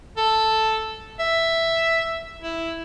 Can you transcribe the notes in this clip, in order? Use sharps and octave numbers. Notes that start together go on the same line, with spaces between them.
A4
E5
E4